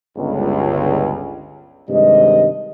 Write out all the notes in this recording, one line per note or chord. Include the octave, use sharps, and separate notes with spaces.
G1 C#2
G2 C3 D#3 G#3 D#5